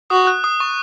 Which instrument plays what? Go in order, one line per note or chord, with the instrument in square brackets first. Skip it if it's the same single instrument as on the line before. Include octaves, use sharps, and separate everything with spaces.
[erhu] F#4 [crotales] D#6
[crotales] F#6
D#6
C#6